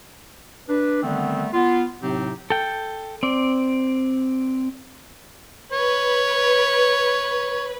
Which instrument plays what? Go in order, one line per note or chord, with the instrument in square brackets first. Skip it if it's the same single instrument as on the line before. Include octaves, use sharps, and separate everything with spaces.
[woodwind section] D4 B4
D3 D#3 G3 A3 B3 C4
B3 F4
A2 C3 F#3 C4 D#4 G4
[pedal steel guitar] A4 G5
C4 D5
[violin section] B4 [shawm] C#5